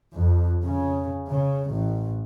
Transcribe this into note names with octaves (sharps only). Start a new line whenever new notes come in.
F2
C#3
C#3
A1